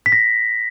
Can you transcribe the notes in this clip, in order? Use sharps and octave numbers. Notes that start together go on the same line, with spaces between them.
B6
A#6